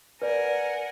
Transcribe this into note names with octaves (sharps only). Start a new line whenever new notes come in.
A#4 B4 D5 F#5 G#5